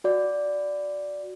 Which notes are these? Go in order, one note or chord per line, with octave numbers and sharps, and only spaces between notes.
F#4 D5